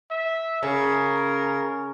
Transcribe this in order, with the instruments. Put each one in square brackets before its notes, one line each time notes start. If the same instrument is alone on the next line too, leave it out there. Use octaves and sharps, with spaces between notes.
[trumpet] E5
[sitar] C#3 [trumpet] A#4